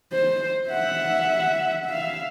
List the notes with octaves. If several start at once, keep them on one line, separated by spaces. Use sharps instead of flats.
C5
E5 F#5
E5 F5